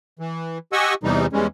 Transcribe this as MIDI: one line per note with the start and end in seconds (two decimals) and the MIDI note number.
0.19 0.58 52
0.73 0.94 67
0.73 0.94 75
0.73 0.94 78
0.73 0.94 80
0.73 0.94 85
0.73 0.94 88
1.03 1.26 40
1.03 1.26 48
1.03 1.26 52
1.03 1.26 55
1.03 1.26 63
1.33 1.47 40
1.33 1.47 52
1.33 1.47 55
1.33 1.47 56
1.33 1.47 61